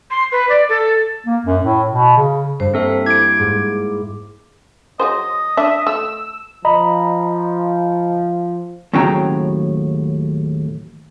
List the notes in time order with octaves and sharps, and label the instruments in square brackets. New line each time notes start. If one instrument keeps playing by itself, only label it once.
[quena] C6
B4
D5
A4
[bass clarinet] A#3
F#2
A2
B2
C#3
[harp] G2 [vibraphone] C5
[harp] A#3 [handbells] C4 A4 E5
[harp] E4 C7 [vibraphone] D6 [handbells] G#6 D7
[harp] G#2
[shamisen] F#3 G#4 C5 [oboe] D#5
[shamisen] D4 [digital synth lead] E5
[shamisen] A3 [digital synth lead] E6
[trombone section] F3 [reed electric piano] D#5 A#5 B5
[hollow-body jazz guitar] D#2 A2 C#3 F#3 G5 A#5